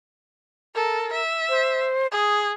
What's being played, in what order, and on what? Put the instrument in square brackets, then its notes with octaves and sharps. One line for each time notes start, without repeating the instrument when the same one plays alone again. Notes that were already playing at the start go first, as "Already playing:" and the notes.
[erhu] A4 [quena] A#4
[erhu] E5
[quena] C5
[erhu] G#4 [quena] D#6